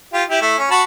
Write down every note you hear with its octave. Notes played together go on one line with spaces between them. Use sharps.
F4 G4
E4 G4
A3 E4
C#4
F#4 A5 B5